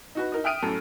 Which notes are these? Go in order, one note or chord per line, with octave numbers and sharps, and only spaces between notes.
D#4 F#4 B4
D#4 A#4 D#5
E5 G5 D#6 F6 D7 D#7
F#2 A2 A4